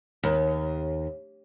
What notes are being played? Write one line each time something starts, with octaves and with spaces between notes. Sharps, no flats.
D#2